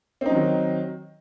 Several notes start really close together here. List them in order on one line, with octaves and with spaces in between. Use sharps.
C4 D#4 F#3 D#3